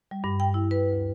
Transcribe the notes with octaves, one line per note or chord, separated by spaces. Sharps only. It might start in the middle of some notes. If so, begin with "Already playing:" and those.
G3
G2
G5
E4
B4
D2